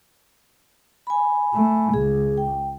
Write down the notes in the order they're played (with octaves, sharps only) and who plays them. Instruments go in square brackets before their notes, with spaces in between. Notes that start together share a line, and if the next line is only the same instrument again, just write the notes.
[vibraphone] G#5 B5
[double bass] A3
[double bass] C#2 [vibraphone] G#4
[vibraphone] G5